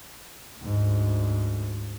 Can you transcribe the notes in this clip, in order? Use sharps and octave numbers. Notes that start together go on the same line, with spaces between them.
D2 G#2